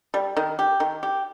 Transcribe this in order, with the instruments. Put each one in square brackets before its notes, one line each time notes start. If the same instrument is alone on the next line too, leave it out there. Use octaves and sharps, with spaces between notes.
[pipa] G3
D#3
G4
D#3
G4